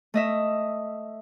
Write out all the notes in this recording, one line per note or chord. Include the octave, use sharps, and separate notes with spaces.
A3 D#5 E5